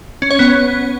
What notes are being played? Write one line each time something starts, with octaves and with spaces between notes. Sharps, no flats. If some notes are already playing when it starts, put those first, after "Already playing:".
C#4
C#5
B3